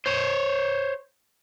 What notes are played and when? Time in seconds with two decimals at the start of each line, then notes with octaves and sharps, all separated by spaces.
0.06 C5 C#5